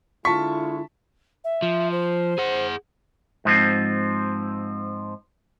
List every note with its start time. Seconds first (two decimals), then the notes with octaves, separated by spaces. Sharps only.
0.25 D3 G#3 E4 F4 A5 C#6 B6
1.44 E5
1.62 F3
1.91 C5
2.38 G#4 F#5
3.45 G#2 F3 C4